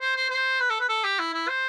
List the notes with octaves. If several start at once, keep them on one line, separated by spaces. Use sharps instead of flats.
C5
C5
C5
B4
A4
B4
A4
G4
E4
E4
C5